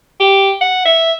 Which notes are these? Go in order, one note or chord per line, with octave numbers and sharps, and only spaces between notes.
G4
F#5
E5